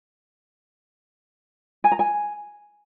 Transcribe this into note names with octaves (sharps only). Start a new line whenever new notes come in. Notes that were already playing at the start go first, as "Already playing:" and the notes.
G#5
A#5
G#5